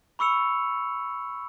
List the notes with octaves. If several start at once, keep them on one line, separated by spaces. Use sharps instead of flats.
B5 C#6 E6 C#7 F7